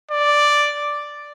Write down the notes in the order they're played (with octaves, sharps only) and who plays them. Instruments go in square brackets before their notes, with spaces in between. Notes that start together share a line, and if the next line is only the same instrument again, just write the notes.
[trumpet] D5